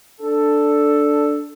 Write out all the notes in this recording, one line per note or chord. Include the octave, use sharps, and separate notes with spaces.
D4 A4